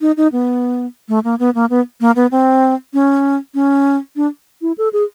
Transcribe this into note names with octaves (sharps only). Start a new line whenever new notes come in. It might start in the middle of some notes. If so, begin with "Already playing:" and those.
D#4
D#4
B3
A3
A#3
B3
A#3
B3
A#3
B3
C4
C#4
C#4
D4
E4
A4
G#4